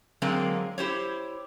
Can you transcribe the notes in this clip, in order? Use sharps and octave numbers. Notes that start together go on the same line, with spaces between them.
D3 F#3 G#3 A#3 C4 A#4
E4 G4 C5 C#5